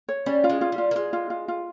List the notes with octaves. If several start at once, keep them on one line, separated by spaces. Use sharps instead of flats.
C#5
G3 C#4
F4
G#3
F4
G3
F4
A#3
G#3 F4
F4
F4
F4